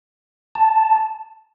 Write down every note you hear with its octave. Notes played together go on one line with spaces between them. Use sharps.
A5